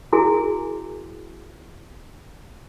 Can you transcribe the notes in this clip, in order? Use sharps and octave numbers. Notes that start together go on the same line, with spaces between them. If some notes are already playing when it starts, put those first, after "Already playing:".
E4 F#4 G#4 A#4 G#5